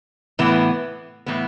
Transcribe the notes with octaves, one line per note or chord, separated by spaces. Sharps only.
A2 E3 B3
A2 E3 B3